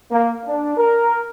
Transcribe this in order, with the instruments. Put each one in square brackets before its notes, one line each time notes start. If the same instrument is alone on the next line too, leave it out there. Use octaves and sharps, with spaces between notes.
[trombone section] A#3
D4
A#4